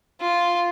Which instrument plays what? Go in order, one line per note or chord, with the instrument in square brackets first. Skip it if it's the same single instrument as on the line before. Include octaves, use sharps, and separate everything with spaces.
[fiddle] F4